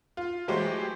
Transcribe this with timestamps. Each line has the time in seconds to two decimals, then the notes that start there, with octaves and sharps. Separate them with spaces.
0.17 F4
0.48 E3 F#3 G#3 A3 G4 C5